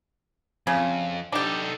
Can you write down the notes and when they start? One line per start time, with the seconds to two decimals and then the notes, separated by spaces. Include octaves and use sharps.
0.67 F2 C#3
1.32 D4 D#4 G4 A4